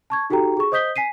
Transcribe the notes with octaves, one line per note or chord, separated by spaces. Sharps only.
A5 C#6 G#6
D#4 F#4 G4 A4 G5 A#5
G#4 C#6
C5 D#5 D#6 G6 B6 G7
G#5 B6 C7 D#7